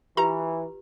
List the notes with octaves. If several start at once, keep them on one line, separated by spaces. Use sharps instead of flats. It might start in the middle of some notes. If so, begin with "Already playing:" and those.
E3 F4 G4 B4 A#5